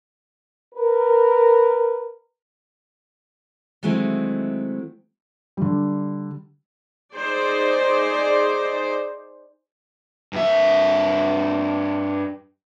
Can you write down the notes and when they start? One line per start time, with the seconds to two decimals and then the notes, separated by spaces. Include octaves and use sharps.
0.75 A#4 B4
3.83 D#3 F#3 G#3 A3 C4 E4
5.57 D3 G3
7.14 D#4 G#4 C5 D5
10.33 G2 E5